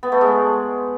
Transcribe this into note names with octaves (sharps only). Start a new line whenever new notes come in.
B3
A3
G#3